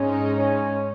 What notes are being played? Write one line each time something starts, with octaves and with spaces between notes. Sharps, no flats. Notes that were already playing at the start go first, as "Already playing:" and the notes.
Already playing: G#2 G#3 C#4 D#4
C#4